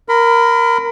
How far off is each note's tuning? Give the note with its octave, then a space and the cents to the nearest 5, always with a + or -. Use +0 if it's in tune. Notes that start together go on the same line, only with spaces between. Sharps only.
A#4 +0 B5 +30